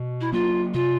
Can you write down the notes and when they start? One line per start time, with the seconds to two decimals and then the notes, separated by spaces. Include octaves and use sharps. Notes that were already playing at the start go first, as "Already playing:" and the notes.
Already playing: B2
0.21 E4
0.32 F#3 A#3 F4
0.74 C3 F4